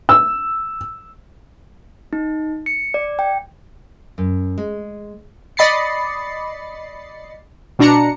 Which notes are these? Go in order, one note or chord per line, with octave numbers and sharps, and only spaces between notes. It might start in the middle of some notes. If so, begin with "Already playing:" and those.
E6
D#4
C#7
D5
G5
F#2
G#3
D5 D#5 B5 A6 C7 C#7
B2 D4 A#5 C#7